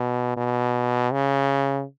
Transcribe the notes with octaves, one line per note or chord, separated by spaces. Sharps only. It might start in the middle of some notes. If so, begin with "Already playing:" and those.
Already playing: B2
B2
C#3